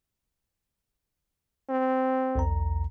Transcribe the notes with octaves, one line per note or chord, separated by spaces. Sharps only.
C4
B1 E2 A#5